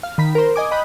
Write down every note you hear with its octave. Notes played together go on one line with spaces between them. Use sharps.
F5
D#3 B5 B6
A#4 C5
D#5 G#5 D6
D#5 G5 B5 D#6 F#6